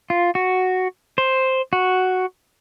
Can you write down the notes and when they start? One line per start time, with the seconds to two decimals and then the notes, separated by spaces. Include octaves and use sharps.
0.10 F4
0.35 F#4
1.18 C5
1.73 F#4